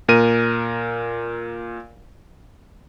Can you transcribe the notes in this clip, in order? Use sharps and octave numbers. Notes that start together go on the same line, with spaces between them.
A#2 A#4 D#7